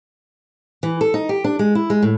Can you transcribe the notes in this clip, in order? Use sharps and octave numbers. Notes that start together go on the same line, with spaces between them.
E3
A4
D#4
G4
D4
G#3
E4
G#3
A2